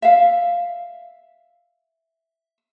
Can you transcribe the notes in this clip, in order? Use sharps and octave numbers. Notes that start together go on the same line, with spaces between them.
E5 F5